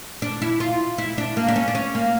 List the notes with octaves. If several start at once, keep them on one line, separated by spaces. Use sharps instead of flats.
D4
E4
F4
E4
D4
A#3
D4
C#4
D4
C#4
A#3